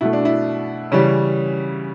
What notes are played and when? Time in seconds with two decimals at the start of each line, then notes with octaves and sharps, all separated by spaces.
0.01 B2 A3 E4
0.13 D4
0.25 E4
0.92 C#3 E3 G3 C#4